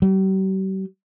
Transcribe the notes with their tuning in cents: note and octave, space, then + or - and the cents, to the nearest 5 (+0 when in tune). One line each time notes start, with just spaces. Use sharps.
G3 -45